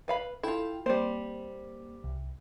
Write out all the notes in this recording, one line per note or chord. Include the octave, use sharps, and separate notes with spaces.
B4 F5 B5
E4 F4 A4 G5
G3 A#3 C4 C5
C2